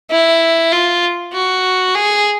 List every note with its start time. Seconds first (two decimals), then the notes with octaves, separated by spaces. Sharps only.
0.11 E4
0.72 F4
1.33 F#4
1.95 G#4